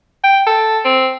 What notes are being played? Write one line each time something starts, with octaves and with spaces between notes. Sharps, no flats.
G5
A4
C4